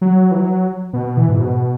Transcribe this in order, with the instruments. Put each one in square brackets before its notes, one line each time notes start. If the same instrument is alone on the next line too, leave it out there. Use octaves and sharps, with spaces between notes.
[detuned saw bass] F#3
E3
F#3
B2
E3
G#2
B2